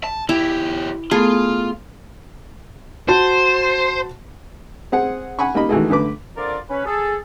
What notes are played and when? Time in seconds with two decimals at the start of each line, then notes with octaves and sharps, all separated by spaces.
0.04 A5
0.29 E2 E4 G4
1.11 A3 B3 F4 G#4 A4
3.09 F#4 C5 A5
4.92 C4 G#4 F#5
5.39 F#5 G#5 B5 C#6
5.54 G3 A#3 D#4 D#5 B5
5.69 D#3 E3 G#3 A3 F#4 G#4
5.90 D3 A3 B4 D6
6.37 D3 F3 C4 F4 A#4 D5
6.70 C#4 B4
6.86 G#4 A4